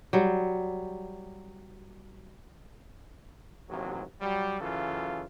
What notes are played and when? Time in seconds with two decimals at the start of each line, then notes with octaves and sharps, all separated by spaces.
0.13 F#3 G3
3.69 A1 D#2 C3 F#3
4.21 F#3 G3
4.61 F#2 C#3 E3 F4 A4